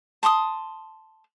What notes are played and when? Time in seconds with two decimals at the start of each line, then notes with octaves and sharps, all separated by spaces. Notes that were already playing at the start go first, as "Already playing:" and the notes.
0.23 A5 C6 D6 D#6